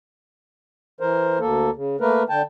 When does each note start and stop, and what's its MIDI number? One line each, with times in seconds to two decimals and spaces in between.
1.00 1.39 52
1.00 1.39 70
1.00 1.39 72
1.40 1.70 38
1.40 1.70 58
1.40 1.70 69
1.76 1.96 49
2.01 2.23 57
2.01 2.23 58
2.01 2.23 70
2.01 2.23 71
2.29 2.42 50
2.29 2.42 79
2.29 2.42 81